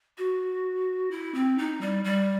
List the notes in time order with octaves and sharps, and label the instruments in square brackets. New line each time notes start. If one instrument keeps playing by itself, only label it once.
[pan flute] F#4
E4
C4
D#4
G3
G3